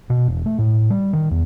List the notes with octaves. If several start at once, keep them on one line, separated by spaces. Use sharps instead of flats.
B2
E1
A3
A2
G3
D#3
E2